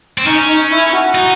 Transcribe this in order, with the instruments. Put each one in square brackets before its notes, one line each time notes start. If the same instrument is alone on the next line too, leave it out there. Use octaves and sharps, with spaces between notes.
[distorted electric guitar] C4
[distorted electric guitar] C#4 [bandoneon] D#4
[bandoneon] D#4
E4
F#4
[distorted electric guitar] D#4